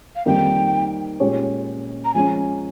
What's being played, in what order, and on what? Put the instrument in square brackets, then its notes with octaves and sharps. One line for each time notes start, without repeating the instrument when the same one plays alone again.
[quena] F5
[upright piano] F2 D#3 G3 A#3 D#4 [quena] G5
[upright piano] A#2 G#3 C#4 G4 C#5
[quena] A#5
[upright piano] F3 G#3 C#4 [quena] G#5